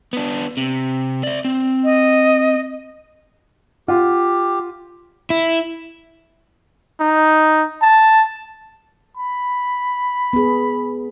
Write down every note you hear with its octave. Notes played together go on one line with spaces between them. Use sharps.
B3 D4
C3
D5 E5
C4
D#5
F4 G4 F#5
E4
D#4
A5
B5
B3 G#4